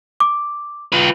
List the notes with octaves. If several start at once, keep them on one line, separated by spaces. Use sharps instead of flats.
D6
F4 B4